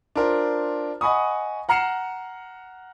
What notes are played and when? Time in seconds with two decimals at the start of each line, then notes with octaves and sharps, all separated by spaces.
0.16 D4 F4 A#4 C5
1.01 D#5 F#5 G#5 B5 C#6 D#6
1.69 F#5 A#5 F6 C7 C#7 E7